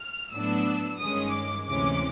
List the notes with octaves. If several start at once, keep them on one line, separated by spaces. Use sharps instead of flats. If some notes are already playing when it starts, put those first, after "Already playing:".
Already playing: F6
A2 F#3 B3 D4 E6
G2 D#3 G#3 C#4 D#6
D6
D2 C3 E3 G#3 C#4 D6